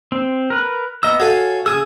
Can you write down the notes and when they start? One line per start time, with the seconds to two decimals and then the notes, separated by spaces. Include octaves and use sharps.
0.12 C4
0.50 A#4 B4
1.03 B3 D#5 A#5 E6
1.20 F#4 A4 C#5 F5 G#5
1.66 C#3 G#4 G#5 E6